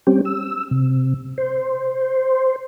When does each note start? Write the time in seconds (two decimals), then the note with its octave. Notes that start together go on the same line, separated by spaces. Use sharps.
0.07 G3 C4 C#4 G4
0.25 E6
0.71 C3
1.38 C5